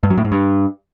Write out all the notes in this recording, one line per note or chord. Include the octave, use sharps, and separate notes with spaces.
G2
F#3
A2
G#2
G2